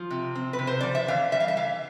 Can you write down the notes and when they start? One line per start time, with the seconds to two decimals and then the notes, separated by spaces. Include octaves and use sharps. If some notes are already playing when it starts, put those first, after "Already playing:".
Already playing: F3
0.11 C3
0.35 C4
0.53 B4
0.59 C3
0.67 C5
0.81 F3 D5
0.95 E5
1.08 E3 F5
1.32 G3 E5
1.40 F5
1.48 E5
1.56 E3 F5